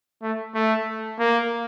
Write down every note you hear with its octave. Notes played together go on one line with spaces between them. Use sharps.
A3
A3
A#3